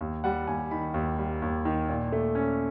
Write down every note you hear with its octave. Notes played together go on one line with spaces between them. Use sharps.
D#2
G3 F#5
D#2 G#5
D#3 B5
D#2
G3
D#2
D#3
A#2
A3
C#4